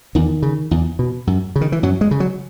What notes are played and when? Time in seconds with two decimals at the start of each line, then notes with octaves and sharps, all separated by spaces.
0.15 E2 D#3
0.42 C#3
0.71 E2
0.99 B2
1.27 F#2
1.56 C#3
1.61 D#3
1.72 E3
1.83 F#2 F#3
2.01 G#3
2.11 C#3
2.20 F#3